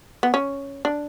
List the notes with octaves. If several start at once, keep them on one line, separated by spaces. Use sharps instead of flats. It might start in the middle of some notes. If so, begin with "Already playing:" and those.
B3
C#4
D4